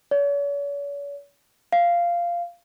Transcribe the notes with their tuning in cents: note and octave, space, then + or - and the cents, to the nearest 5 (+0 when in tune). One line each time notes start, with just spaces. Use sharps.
C#5 +45
F5 -10